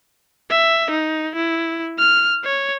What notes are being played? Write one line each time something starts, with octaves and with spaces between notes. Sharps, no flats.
E5
D#4
E4
F6
C#5